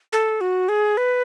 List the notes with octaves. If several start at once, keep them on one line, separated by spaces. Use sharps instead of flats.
A4
F#4
G#4
B4